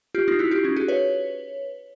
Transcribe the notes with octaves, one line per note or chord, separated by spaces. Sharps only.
F4 G4
D#4 F4
E4 F#4
F4 G4
C#4 D#4
F#4 G#4
B4 C#5